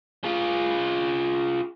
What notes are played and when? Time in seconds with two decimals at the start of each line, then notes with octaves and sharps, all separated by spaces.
0.24 F4 G#4